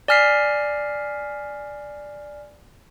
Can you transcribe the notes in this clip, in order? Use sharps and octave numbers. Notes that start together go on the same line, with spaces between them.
D5 G#5 F6 B6 C7